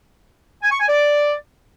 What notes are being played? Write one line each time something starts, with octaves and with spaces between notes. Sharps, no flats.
G#5
C#6
G#5
D5